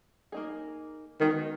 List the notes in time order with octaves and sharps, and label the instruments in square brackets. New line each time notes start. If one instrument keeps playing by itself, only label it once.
[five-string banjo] A#3 D#4 G#4
[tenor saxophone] D#3 [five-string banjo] G#3 B3 D#4 F#4